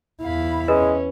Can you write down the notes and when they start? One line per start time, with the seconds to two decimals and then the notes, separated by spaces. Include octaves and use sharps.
0.23 E2 E4 F5 B5
0.68 G#3 C#4 B4